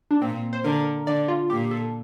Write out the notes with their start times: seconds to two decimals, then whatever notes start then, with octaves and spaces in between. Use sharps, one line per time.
0.11 D4
0.21 A#2 C4
0.53 C5
0.64 D3 A#4
1.07 D3 D5
1.28 F4
1.50 A#2 G4
1.71 A4